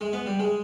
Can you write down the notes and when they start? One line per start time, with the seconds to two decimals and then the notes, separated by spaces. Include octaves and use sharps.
0.01 G#3
0.13 B3
0.26 G3
0.40 G#3